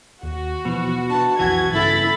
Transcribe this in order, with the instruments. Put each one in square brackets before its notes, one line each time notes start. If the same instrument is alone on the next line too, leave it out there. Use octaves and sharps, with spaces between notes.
[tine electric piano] D#2 [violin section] F#4
[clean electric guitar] B2 [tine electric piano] E3 F3
[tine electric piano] D4 B4 [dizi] A5
[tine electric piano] B1 F2 G#5 [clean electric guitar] E3 [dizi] F#4 [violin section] G#6
[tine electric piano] G2 C#3 B3 [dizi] E4 [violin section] A4 B5 A6